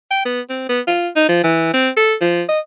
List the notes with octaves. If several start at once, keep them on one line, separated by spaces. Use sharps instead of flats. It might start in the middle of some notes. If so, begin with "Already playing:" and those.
G5
B3
C4
B3
F4
D#4
F3
E3
C4
A4
F3
D#5